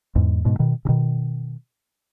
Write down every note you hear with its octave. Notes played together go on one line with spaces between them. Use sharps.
E2 G#2
G#2 B2
B2 D#3
C#3
B2 D#3